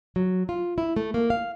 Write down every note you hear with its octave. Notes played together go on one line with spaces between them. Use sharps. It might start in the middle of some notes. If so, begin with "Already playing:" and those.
F#3
F4
E4
A3
A#3
F5